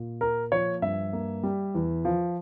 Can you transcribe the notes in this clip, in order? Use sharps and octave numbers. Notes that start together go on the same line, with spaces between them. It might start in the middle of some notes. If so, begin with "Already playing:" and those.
Already playing: A#2
A#3 A#4
F3 C#5
G2 E5
A#3
G3
E2
F3